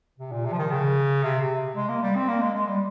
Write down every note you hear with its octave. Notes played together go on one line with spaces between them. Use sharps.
C3
A#2
C3
F3
D#3
C#3
C3
C3
G#3
A#3
G3
C4
A#3
G#3
G#3
G3